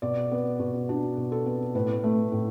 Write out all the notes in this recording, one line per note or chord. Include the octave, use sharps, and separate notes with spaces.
B2 D5
B3
B2
D4 F#4
B2
A4
B3
A2 B4
A3
A2